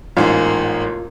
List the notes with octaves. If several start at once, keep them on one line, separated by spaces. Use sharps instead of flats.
A1 G#2 A#3 F4